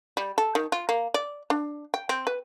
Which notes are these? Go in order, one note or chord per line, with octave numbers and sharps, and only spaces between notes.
G3
A4
D#3
F4
A#3
D5
D4
G5
C4
B4